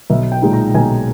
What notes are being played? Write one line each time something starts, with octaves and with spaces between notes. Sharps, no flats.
B1 E5
G5
A#2 G#3 D#4
A#5
B1 G#5